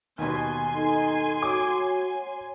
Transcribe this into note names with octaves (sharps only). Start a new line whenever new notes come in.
D#2 B2 G#5 C6
D#4 A4
F#4 C#5 D6